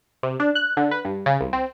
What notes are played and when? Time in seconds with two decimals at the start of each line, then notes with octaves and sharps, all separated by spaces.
0.23 C3
0.40 D4
0.55 F#6
0.77 D3
0.91 B4
1.05 G2
1.26 C#3
1.41 C2
1.53 C4